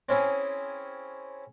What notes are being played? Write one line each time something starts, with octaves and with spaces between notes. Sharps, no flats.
C4 C#4 E4 G#4